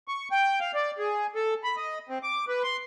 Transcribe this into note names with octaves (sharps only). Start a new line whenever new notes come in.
C#6
G5
F5
D5
G#4
A4
B5
D#5
C4
D6
B4
C6